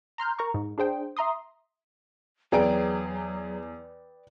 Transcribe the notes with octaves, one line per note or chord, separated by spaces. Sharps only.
A#5 C6 F6 G6
A#4 A#5 C#6
G#2
D4 G#4 C5 G5
E5 A#5 C6 D#6
E2 F#3 G#4 B4 D5 G5 A#5 D7